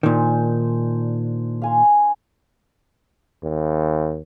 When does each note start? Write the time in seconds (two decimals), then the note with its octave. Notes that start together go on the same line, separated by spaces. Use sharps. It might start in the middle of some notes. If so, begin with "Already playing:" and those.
0.03 A#2 D#3 D4 C5 G#5
1.62 F5 G#5 C6
3.43 D#2